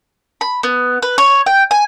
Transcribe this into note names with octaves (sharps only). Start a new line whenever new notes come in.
B5
B3
B4
C#5
G5
G#5